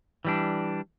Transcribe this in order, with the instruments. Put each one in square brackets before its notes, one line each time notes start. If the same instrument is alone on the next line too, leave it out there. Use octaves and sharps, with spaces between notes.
[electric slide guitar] E3 G3 D4